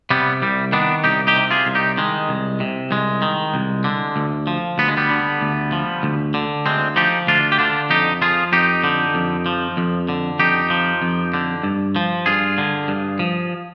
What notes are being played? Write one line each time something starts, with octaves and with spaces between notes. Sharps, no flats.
C3 G3 B3
C2 G3
D#3 B3 D4
C2 D#4 G4
D#4 G4
C3
F4 G#4
C2
D#4 G4
D#3 G#3
C2
C3
C2 G#3
D#3
C2
D3
D2
F3
D2 B3
G#3
G3 B3
D3
D2
F3
D2
D3
D2 G#3 C4
F3 D#4 G4
D2 D4 F4
G4
D3 D4 F4
F2 D#4 G4
F3 F4 G#4
F2 D#4 G4
D3
F2
F3
F2
D3
F2 D#4 G4
F3
F2
D3
G2
F3
G2 F4 G#4
D3
G2
F3